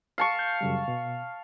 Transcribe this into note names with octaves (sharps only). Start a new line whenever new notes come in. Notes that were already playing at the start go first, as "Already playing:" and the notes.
F5 A5 C#6
G6
F#2 C#3 G3
B2